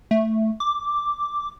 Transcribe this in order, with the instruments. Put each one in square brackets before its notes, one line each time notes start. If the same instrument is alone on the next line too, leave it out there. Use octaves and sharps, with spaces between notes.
[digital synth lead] A3
D6